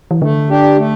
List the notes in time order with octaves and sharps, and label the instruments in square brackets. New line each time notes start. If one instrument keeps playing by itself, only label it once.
[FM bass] E3
[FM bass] D3 [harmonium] A3
[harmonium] D4 G4
A3